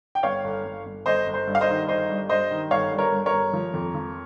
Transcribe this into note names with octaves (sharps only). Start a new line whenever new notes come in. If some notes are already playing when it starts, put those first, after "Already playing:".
G5
G1 C#5 F5
G1
G1
G1
G1 C5 D#5
G1
C5
G2
F5
C5 D#5
D#3
G1 C5 D#5
G2
G2 C5 D#5
D#3
G1 C#5 F5
G2
A#4 C#5
G2
A#4 C#5
G1
F3
F2
F3